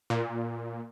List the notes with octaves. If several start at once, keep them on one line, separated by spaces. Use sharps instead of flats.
A#2